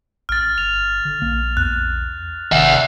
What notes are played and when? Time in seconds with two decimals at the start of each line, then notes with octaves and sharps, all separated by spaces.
0.29 A1 F6 A6
0.58 G1 F7
1.05 D3
1.22 A#1 A#3
1.57 E2 F#6
2.52 G1 C3 D#3 E5 F#5